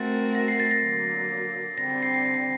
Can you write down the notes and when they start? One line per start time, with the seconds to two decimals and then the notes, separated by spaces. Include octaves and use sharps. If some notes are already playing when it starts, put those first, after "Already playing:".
Already playing: A3 C4 F#4 A#4 A6
0.35 A#6
0.48 C7
0.60 A6
0.71 A#6
0.83 D3 F#3 A#3
1.78 D3 G3 C4 A#6
1.90 A#6
2.03 C7
2.14 C7
2.26 A#6
2.34 C7